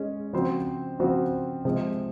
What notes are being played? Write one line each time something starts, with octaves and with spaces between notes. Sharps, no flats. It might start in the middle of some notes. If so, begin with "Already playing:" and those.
Already playing: G#3 C#4 G#4 D#5
C#3 F3 C4 F#4 C5
C#3 F3 C4 F#4 C5
C3 F3 G#3